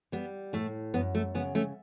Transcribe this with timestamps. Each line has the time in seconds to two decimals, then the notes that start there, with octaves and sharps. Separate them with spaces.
0.12 G3 B3
0.53 A2 A3
0.94 F#2 B3
1.15 A3
1.35 C#3 B3
1.55 A3 C#4